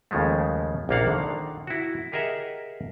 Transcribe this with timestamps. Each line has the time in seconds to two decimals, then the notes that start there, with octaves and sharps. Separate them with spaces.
0.11 D#2 C#3 F3 G#3 A3
0.89 A#1 C3 A#3 D4 F5 F#5
1.08 D3 D#3
1.67 E4 F#4
2.12 G4 G#4 A#4 D#5 E5 F#5